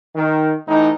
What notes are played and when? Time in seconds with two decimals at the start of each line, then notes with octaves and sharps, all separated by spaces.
0.15 D#3
0.67 A2 E3 D#4